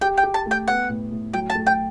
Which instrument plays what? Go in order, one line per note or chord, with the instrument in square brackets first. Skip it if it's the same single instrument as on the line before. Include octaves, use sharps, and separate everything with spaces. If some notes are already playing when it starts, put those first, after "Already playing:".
[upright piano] G4 [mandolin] G5
[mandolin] G5
[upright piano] G4
[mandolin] A5
[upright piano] A3
[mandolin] G5
[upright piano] B3 [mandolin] F#5
[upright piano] A2
A2
[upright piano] F#3 [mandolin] G5
[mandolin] A5
[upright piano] A3
[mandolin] G5